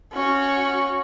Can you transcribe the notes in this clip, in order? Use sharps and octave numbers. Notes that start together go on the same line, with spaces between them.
C#4 F#4